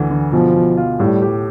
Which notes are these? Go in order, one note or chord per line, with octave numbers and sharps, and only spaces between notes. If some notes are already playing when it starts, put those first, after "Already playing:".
Already playing: D2 D3 E3
D3
B2 F3
B2
F4
A2 G3
G4